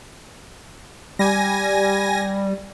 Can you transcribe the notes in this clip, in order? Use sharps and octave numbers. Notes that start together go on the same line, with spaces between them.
G3 G#5 A#6